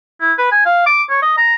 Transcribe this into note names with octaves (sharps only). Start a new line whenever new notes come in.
E4
B4
G#5
F5
D6
C#5
D#5
A#5